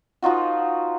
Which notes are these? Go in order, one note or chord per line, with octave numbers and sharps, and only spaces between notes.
F3 D#4 F4 F#4